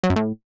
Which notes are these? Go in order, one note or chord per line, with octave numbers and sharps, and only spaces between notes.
F#3
F#2
A2